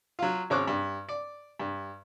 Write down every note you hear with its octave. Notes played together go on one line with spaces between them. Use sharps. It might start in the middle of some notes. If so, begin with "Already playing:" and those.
F#3 F4
G#1 C#4 C5 C#5 D6 F#6
G2
D5
G2